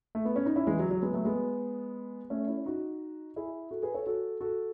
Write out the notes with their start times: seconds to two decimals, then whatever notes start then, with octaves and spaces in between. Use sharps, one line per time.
0.15 A3
0.25 B3
0.36 C#4
0.46 D#4
0.56 C#4 E4
0.67 E3 G#3
0.79 F#3
0.91 F#3
1.02 G#3 B3
1.13 F#3 A3
1.25 G#3 B3
2.30 A3 C#4
2.48 C#4 E4
2.66 D#4 F#4
3.36 E4 G#4
3.71 F#4 A4
3.83 G#4 B4
3.94 A4 C#5
4.06 F#4 A4
4.41 F#4 A4